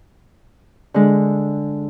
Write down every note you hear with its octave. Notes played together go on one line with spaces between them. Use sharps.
D3 G#3